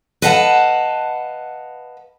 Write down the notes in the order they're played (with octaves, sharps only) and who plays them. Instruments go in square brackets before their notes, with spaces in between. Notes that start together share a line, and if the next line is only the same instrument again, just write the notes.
[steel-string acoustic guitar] B4 D#5 F5 F#5 G#5 A5